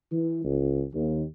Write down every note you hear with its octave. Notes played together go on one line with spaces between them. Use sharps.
E3
C#2
D#2